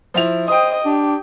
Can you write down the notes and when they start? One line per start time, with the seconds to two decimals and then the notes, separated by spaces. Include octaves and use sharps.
0.14 F3 E4 F7
0.48 C5 D#5 G5 D#6
0.85 D4 G4